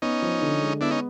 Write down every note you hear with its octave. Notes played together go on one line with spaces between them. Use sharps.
B3 C#4 D#4
F3
D3
G#3
B3 D4 E4
C#4 D#4